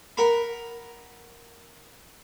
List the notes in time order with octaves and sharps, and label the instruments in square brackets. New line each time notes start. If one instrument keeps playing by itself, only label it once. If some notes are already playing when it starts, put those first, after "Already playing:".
[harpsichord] A#4 F#5 A#5 B5